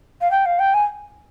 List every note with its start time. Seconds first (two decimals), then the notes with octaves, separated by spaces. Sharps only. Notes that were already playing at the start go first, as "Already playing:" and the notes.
0.21 F5
0.31 G5
0.46 F5
0.59 G5
0.74 G#5